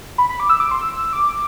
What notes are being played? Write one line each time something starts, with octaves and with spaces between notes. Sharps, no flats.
B5
B5
D6
E6
D6
C6
E6
D6